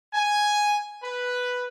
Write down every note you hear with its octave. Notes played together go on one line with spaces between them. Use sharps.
G#5
B4